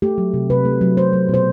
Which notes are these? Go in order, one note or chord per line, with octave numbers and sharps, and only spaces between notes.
A3 G4
F#3
C3
C3 B4
A3
F#3
A3 C5
F#3
B2 C5